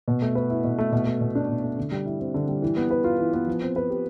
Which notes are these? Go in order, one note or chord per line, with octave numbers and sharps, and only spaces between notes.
B2
A3
B4
E4
B2
A3
B2
A3
B2
D4
B2
A3
D3
G3
E4
C4
D3
G3
E3
B3
B4
F4
E3
B3
F3
C4
B4
G4